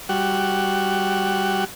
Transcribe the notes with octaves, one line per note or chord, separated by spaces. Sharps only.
G3 F#4